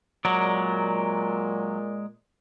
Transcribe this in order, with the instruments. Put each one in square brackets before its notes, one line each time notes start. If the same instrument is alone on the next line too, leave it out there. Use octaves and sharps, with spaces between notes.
[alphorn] A#2 [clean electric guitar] F#3 [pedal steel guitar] G#3 A#4 D5